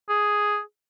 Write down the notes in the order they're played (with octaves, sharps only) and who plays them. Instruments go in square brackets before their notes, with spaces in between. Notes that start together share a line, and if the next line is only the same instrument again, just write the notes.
[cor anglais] G#4